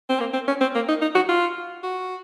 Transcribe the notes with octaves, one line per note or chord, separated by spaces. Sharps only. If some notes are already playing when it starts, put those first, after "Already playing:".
C4
A#3
C4
C#4
C4
A#3
D#4
D#4
F#4
F4
F#4